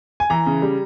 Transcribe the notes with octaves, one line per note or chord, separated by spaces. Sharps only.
G#5
E3 A#5
C#3
G3